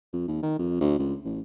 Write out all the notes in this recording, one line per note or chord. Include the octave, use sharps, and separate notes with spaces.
F2
D#2
D#3
F2
D2
C#2
A1